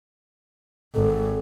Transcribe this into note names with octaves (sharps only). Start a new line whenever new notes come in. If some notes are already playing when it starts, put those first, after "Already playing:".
G#1 A4